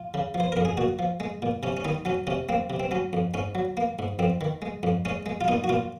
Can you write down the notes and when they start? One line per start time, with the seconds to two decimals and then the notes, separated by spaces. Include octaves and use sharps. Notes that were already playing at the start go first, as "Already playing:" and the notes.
Already playing: F4
0.14 C#3
0.34 F3
0.40 C5
0.52 F2 A#4
0.65 G#4
0.77 A#2 F#4
0.99 F3
1.20 G#3
1.42 A#2
1.63 C3 C#4
1.77 C#4
1.85 D#3 D#4
2.05 F#3 C#4
2.27 C3 C#4
2.49 A#3 C4
2.70 C3
2.80 C4
2.91 F#3 C#4
3.13 F2
3.34 G#2 C#4
3.55 F#3
3.77 A#3
3.99 G#2
4.19 F2 C4
4.41 D#3
4.62 G#3
4.83 F2
5.05 G#3 C#4
5.26 G#3
5.41 F4
5.48 A#2 D#4
5.64 F#4
5.69 A#2 F4